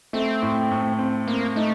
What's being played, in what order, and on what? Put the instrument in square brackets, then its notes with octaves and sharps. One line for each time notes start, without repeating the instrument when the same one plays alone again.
[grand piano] A3 [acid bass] C4
[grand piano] A2
A2
C4
[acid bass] A#3 [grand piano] C4
[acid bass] A3 [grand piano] D#4